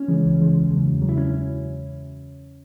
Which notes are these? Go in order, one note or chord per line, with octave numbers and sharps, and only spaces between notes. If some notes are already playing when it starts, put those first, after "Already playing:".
Already playing: C#4
C#3 E3 G#3
C#2
C#3 E3 G#3
E2
C#3 F#3
E2
C#3 F#3
E4
C#4